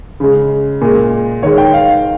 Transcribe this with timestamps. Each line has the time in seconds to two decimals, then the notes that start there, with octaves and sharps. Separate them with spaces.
0.20 C#3 G#3
0.81 A#2 G#3
1.43 D#3 G#3 C#5
1.58 G5
1.74 F5